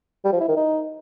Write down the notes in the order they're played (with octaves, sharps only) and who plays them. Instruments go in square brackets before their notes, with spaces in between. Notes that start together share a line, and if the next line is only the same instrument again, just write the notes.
[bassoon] G3
F3
E4
D#3
D#4